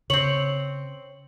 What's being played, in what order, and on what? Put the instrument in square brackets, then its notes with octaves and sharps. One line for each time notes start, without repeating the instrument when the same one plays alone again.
[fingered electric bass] C#3 [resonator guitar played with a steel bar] C4 C#5 [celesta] F#7